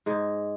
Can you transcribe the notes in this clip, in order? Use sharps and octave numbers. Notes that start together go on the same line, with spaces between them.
G#2 G#3